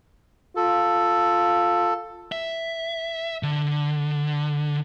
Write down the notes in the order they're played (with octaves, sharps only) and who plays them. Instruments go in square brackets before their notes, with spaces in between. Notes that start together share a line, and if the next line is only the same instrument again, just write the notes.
[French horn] F4 [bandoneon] A4
[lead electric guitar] E5
D3